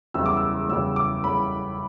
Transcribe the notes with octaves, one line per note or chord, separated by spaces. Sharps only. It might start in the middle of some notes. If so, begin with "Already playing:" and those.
F#1 E2 C#3 G3 E6
D6
E6
F#1 E2 C#3 G3 E6
D6
C#3 G3 B5